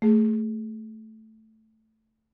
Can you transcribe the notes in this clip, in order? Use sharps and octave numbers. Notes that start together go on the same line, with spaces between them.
A3 G#4